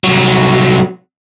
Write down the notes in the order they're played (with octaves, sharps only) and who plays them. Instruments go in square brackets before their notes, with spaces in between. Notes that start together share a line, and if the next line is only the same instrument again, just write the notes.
[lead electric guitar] C2 F#3